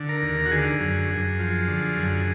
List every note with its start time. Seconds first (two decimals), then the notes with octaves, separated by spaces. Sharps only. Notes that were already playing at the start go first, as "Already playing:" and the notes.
Already playing: D3
0.09 A#4
0.22 D#2
0.46 F#4
0.51 D3 G#4
0.80 F#2
1.10 F#2
1.39 F3
1.68 D3
1.96 F#2